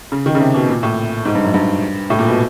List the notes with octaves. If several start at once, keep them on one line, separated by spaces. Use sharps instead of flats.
C#3
D#3
C#3
C3
B2
A#2
A2
G#2
G2
F#2
G2
A2
A#2
B2